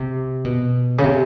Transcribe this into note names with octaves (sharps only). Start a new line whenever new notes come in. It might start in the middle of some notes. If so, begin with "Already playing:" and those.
Already playing: C3
B2
C#3
C3